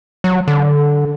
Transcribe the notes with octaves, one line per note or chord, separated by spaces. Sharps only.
F#3
D3